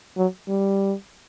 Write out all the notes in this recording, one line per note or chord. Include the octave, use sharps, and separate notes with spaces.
F#3
G3